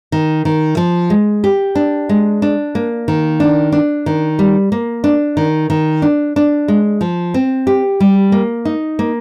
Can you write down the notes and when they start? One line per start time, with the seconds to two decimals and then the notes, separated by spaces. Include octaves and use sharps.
0.12 D#3
0.45 D#3
0.77 F3
1.10 G#3
1.44 G4
1.75 D4
2.09 G#3
2.42 D4
2.75 A#3
3.08 D#3
3.40 D4
3.72 D4
4.06 D#3
4.39 G3
4.72 A#3
5.04 D4
5.37 D#3
5.70 D#3
6.02 D4
6.36 D4
6.68 G#3
7.01 F3
7.34 C4
7.67 G4
8.00 G3
8.32 A#3
8.65 D#4
8.99 A#3